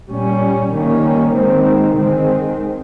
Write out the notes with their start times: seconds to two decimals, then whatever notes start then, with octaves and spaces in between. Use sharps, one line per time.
0.09 A#2 G3 C#4
0.72 D#3 G3 A#3 C#4
1.34 D#3 G#3 C4
1.97 D#3 G#3 C4